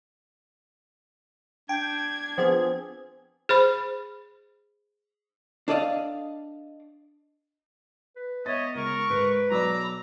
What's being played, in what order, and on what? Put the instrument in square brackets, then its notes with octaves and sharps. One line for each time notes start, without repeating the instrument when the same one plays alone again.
[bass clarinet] D4 [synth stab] G5 [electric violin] G#6
[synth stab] F3 B3 G#4 [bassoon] C4
[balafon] G#4 C5 B5
[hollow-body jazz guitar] D4 A4 D5 D#5 F5
[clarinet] B4
[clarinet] B3 [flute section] C#5 E5 [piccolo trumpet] D#5 [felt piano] A6
[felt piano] C#2 [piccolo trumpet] A#4 [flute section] C#6
[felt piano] G#2 D7 [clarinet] B4
[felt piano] B1 D5 [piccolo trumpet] A#5 [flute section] B5 D6 E6